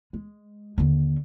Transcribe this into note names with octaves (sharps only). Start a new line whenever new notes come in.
G#3
D#2 D3